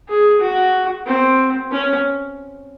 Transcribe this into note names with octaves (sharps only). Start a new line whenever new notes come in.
G#4
F#4
C4
C#4